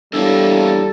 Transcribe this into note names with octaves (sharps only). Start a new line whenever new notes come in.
E2 G3 A#3 D4 E4 A4 C#5